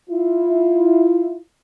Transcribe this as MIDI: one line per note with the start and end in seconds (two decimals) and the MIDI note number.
0.10 1.37 64
0.10 1.37 65